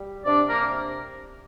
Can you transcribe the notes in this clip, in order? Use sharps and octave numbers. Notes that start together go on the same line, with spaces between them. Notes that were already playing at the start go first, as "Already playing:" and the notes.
Already playing: G3
C3 D4 D5
A#3 A#4
C3